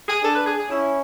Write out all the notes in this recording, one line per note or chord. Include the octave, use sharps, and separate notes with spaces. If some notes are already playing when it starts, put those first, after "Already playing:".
G#4
D4 A4
B4
G#4
G#4
C#4 E4